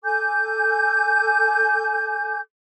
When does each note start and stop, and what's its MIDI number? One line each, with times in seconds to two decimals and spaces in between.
0.04 2.40 69
0.04 2.40 80
0.04 2.40 86
0.04 2.40 91